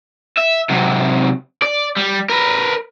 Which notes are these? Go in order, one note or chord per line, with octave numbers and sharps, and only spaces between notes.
E5
C3 F#3
D5
G3
A#4 B4